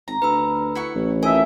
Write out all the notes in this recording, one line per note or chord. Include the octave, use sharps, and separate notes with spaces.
G#1 A#5
D2 B4 B5 E6
E4 F#5 C#6
A1
F2 D#3 D#5 E5 G#5